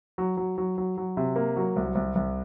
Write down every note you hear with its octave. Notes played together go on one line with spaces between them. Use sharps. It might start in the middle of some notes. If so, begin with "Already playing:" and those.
F#3
F#3
F#3
F#3
F#3
C3
A#3
F#3
C2
C2
C2